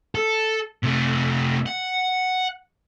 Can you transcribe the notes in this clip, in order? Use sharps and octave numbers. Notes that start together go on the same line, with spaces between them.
A4
C3 A3
F#5